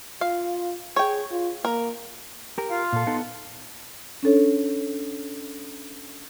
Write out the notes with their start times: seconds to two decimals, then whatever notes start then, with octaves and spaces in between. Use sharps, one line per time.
0.21 F4 F5
0.96 G#4 C#5 G5
1.31 F4
1.65 A#3 A#4
2.58 G4 A#4
2.70 F4 F5
2.93 A#2 A4
3.07 B3 D#4 A4
4.23 C#4 D4 A4 C#5